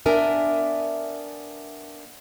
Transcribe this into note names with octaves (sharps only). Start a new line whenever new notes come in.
B3 D4 A#4 E5 G#5